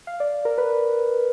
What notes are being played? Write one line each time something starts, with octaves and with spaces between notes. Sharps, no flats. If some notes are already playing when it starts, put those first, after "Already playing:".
F5
D5
A#4
B4